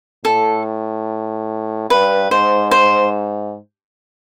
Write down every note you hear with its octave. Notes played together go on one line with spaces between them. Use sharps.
A2 A4
G2 B4
G#2 C5
C5